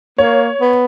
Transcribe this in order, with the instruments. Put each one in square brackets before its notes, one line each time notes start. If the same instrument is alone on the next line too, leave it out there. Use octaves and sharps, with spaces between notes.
[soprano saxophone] A#3 [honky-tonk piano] C#5
[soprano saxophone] B3